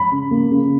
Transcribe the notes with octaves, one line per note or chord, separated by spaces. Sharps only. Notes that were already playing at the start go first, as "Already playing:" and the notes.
Already playing: B5
C#3
A#3
C#3